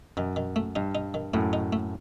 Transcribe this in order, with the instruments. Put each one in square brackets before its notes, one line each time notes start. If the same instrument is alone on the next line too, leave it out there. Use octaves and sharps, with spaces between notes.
[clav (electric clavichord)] F#2 [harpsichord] D#3
[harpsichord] D#3
A3
[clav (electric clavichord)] G2 [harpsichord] D#4
[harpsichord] D#4
D#3
[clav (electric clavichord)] F#2 A2 [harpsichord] A3
[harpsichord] D#4
A3